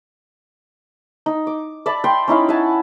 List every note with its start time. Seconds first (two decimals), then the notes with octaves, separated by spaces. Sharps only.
1.26 D#4
1.47 D6
1.86 D5 E5 A5 B5
2.04 G5 B5 C6
2.28 C#4 D#4 E4 F5
2.49 E5 F#5 G#5 A5